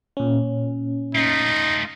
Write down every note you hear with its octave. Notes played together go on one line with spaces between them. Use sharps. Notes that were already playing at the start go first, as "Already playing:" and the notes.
A#2 C#4
A3 D#4 F4